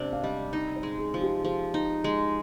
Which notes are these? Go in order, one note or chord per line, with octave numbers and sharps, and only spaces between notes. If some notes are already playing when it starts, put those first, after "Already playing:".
Already playing: C3 D4 C5 D5
F5
G3 D#5
D#4 D5
C5
G#3
G#4
F3
G4
F3 G#4
D#4
G#3